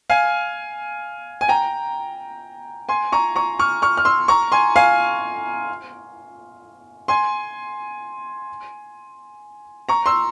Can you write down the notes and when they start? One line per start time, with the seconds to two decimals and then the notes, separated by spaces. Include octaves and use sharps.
0.10 F5 G#5
1.41 G#5
1.48 G5 A#5
2.89 G#5 C6
3.12 A#5 C#6
3.36 A#5 C#6
3.59 C#6 F6
3.82 C#6 F6
3.97 F6
4.05 C6 E6
4.28 A#5 C#6
4.52 G#5 C6
4.76 F5 G#5
7.08 G#5 C6
9.89 A#5 C#6
10.06 C6 E6